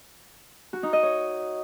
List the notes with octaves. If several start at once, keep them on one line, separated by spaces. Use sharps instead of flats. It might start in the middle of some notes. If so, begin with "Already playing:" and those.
F#4
D#4
D#5
C#5